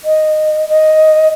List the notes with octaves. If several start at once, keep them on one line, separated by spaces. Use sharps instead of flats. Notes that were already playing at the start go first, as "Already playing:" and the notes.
D#5
D#5